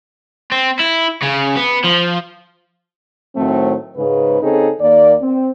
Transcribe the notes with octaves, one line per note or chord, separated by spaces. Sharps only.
C4
E4
C#3
B3
F3
A2 D#3 F#3 A3 C4
G#2 C#3 B4
C#3 C4 C#4 D#4 G#4 A4
D#2 D#3 A#3 D5
C4